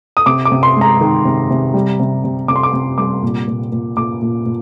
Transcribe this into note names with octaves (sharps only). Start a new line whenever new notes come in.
D#6
C3 D6
D6
C3
C6
G#3 A#5
D#3
C3
C3
G3
C3
C3
C3 D6
C6
D6
C3
G3 D6
A#2
A#2
A#2
A#2 D6
A#2
A#2